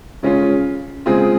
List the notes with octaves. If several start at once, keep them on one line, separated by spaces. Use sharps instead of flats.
C#3 G#3 C#4 F4
C#3 G#3 C4 F4 G#4